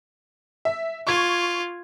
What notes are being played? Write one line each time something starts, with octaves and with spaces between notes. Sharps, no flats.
E5
F4 C#6 G#6